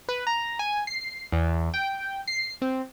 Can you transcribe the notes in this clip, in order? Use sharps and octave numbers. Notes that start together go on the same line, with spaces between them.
B4
A#5
G#5
C7
E2
G5
C7
C4